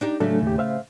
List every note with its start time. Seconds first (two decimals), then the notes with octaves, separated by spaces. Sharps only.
0.01 D4 D#4 G4
0.20 A2 C#3 F#3 A3 D4 A4
0.43 D#2 G4
0.58 C5 E5 F5